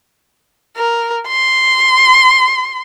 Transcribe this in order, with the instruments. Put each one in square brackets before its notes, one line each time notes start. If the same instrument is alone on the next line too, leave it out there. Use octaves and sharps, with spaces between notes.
[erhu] A#4
C6